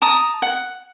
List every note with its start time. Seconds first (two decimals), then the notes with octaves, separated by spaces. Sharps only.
0.02 A5 A#5 D#6
0.42 F#5